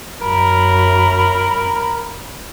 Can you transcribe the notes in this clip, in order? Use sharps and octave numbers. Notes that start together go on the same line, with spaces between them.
F#2 A#4 B5